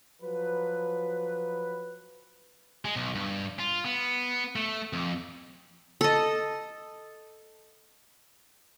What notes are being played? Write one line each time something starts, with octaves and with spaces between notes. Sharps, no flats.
F3 F#3 B4
G#3
B1
G2
F4
B3
A3
F2
A4 D#5